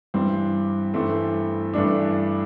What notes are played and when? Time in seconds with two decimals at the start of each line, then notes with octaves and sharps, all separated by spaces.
0.14 G2 E3 G3 C4
0.94 G2 E3 A3 C4
1.74 G2 E3 A3 D4